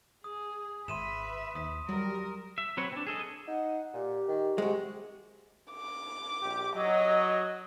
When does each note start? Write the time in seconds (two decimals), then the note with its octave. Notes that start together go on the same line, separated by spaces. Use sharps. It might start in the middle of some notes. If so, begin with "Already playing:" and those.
0.24 G#4 D#6
0.88 G#1 B4 E5 C6 D#7 E7
1.55 D#2 D#6
1.89 F#3 G3 A#4
2.58 E5
2.77 F#3 C4 B4 C#5
2.92 C4 D4
3.07 G#4 A4 D#5
3.48 D#4 F#5
3.94 A#2 G4
4.28 D#3
4.58 C3 G#3 F#4
5.73 D6
6.42 A#1 G4
6.76 F#3 D#5